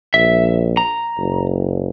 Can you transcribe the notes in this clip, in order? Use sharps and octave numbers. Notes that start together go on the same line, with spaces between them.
A#1 E5
A#5
F#1